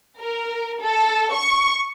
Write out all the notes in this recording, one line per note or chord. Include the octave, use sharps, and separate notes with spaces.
A#4
A4
C#6